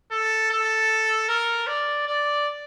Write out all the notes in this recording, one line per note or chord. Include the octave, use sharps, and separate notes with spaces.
A4
A4
A#4
D5
D5